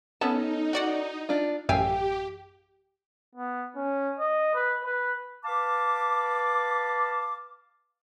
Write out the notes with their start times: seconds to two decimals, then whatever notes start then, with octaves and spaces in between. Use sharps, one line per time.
0.21 B3 C#4 D#4 A4 A5
0.73 F#4 D5 F#5
1.29 D4 F4
1.69 A1 F#2 G4 E5 F5 G5 G#5
3.35 B3
3.75 C#4
4.19 D#5
4.54 B4
4.84 B4
5.44 B4 F5 A5 D6